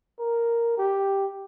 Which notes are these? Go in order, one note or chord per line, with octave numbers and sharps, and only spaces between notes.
A#4
G4